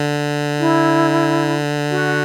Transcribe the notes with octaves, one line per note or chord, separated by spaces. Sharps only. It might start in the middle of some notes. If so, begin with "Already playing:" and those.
Already playing: D3
E4
F#4